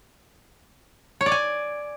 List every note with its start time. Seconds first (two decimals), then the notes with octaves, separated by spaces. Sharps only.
1.21 C#5
1.26 D5
1.32 G#5